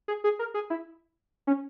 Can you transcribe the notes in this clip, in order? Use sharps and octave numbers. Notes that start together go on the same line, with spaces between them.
G#4
G#4
A#4
G#4
E4
C#4